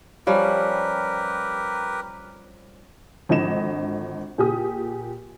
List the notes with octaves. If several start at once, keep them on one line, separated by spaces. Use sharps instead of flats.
F3 G3 C#4 G4 A#4 B4
G#1 D3 F3 D#5 E7
A#2 G4 G#4 D#6